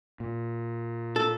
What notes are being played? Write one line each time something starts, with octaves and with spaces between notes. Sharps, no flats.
A#2
A4